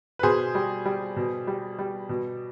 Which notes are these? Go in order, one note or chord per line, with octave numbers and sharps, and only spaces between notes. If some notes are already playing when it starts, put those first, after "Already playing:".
B4
B2 G#4 C5
G3
G3
B2
G3
G3
B2